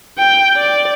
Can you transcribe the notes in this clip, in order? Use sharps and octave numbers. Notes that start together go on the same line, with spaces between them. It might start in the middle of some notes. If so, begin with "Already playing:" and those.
G5
D5